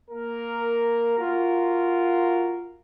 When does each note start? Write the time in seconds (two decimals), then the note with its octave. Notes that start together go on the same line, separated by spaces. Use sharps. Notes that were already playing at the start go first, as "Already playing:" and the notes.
0.11 A#3 A#4
1.18 F4 F#4 A#4